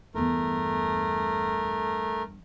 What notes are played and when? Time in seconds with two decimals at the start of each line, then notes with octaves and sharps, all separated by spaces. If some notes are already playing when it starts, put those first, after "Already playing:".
0.14 E2 G2 A3 A#4